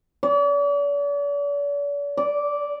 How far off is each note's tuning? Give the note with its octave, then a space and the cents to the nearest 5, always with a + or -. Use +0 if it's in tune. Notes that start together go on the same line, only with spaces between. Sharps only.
D5 -45
D5 -10